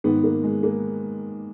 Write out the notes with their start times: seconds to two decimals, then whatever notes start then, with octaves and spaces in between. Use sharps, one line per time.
0.04 G#2 D#3 B3
0.24 A#3
0.44 G#3
0.63 A#3